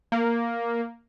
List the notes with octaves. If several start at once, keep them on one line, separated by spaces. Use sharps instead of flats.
A#3